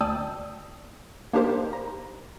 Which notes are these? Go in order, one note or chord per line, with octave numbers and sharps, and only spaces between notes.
D2 D5 G5 A5 D#6 E6
A#3 D4 D#4 G4 A#4 C5
A#5